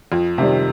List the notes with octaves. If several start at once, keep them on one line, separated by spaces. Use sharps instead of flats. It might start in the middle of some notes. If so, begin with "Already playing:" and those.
F2
C3 D#3 G3